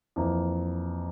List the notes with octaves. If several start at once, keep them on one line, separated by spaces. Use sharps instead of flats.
F2 E3 A#3